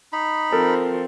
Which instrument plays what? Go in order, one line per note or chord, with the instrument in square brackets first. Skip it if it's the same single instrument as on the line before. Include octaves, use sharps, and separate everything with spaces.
[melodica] D#4 B5
[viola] F3 C4 [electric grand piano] A4 A#4